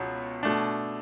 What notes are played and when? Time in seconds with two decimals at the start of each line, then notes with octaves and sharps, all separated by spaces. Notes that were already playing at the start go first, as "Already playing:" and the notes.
Already playing: C#2 B2 F#3 B3
0.43 B2 A3 D4